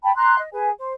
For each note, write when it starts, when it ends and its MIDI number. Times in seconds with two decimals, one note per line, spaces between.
0.03 0.13 79
0.03 0.13 81
0.03 0.13 83
0.16 0.38 82
0.16 0.38 84
0.16 0.38 90
0.39 0.49 75
0.53 0.70 68
0.53 0.70 71
0.53 0.70 80
0.79 0.94 72